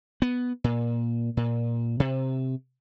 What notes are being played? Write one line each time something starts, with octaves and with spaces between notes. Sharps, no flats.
B3
A#2
A#2
C3